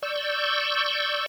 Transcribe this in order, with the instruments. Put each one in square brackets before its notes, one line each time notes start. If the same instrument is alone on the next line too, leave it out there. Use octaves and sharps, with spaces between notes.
[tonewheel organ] D5 C#6 E6 G6